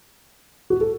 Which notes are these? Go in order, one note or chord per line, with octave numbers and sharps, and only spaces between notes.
F#4
A4